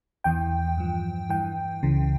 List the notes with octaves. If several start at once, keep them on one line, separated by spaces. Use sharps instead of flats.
E2 E3 G5
G2 F3
G2 E3 G5
C#2 C#3 E3